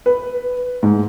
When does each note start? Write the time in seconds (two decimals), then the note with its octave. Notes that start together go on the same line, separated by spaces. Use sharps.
0.06 B4
0.83 G#2